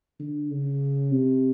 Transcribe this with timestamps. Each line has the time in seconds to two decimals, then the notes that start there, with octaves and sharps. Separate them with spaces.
0.20 D3
0.51 C#3
1.11 C3